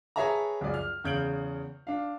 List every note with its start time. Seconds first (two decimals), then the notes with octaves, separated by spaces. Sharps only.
0.16 G#4 B4 C#5 E5 A5 A#5
0.61 C#2 F#2 F3 G#4 D5
0.74 F6
1.04 E2 C#3 G6 D7 F#7
1.87 D4 F5